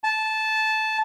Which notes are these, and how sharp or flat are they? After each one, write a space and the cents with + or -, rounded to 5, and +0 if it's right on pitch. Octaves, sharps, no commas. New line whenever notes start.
A5 -15